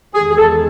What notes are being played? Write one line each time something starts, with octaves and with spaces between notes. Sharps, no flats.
E2 D#3 G#3 G#4
G#4
A4